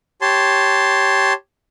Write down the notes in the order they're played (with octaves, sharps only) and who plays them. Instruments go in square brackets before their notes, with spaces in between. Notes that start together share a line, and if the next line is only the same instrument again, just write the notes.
[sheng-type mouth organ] G4 C#5 A5 C6